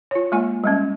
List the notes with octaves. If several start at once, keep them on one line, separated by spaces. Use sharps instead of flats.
F4 C#5
G#3 A#3 F4 G#5
G3 G#3 C#4